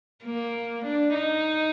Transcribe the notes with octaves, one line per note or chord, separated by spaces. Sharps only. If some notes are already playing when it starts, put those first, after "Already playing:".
A#3
D4
D#4